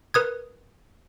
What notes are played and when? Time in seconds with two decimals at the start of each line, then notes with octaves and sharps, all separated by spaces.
0.14 A#4 B4 D#6 G#6